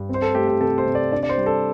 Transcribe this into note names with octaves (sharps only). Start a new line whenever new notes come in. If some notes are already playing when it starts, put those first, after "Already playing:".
Already playing: G2
C4
C5
A4
A3 G4
G4
C3 A4
C5
C3
D5
D4 D5
D5
C5
G3
A4